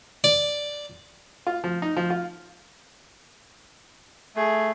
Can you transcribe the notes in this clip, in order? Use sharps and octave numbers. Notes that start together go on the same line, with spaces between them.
D5
F4
F3
D#4
F3
F4
A3 G#4